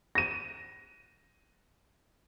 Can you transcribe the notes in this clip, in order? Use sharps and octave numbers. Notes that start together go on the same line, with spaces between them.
A#6 D#7